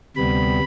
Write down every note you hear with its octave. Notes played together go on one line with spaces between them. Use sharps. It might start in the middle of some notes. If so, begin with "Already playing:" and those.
D2 C3 G3 B3 B5